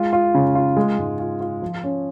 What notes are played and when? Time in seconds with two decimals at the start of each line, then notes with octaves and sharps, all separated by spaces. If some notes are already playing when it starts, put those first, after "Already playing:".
Already playing: G#3 F4
0.13 F4
0.34 C#3
0.55 F4
0.77 G#3
0.98 G#2
1.19 F4
1.41 F4
1.62 F3
1.83 C#4